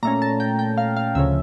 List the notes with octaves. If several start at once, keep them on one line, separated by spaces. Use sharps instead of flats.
A#2 A3 C#4 A#5
A5
G5
G5
F5
F5
D2 C#3 F3 C#4 E5